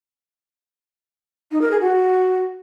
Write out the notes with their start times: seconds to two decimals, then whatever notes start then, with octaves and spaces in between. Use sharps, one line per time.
1.52 D#4
1.61 A#4
1.71 G#4
1.81 F#4